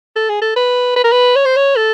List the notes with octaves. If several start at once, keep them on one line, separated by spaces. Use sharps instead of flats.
A4
G#4
A4
B4
B4
A#4
B4
C#5
C5
C#5
A4